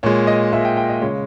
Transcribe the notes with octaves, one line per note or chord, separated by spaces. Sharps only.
A#2 G#3 C#5
D#5
A#2 G#3 E5
G5
G5
D#5
C#3 G#3 C#5